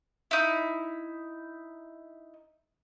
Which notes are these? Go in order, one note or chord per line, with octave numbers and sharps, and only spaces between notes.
D#4 E4